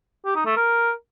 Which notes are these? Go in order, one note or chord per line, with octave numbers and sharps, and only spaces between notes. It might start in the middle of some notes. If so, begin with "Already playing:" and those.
G4
D#4
A3
A#4